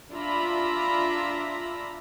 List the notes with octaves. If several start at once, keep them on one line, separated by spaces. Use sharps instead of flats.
D4 F4 E5 A#5 B5